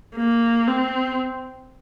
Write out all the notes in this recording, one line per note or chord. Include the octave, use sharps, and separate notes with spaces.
A#3
C4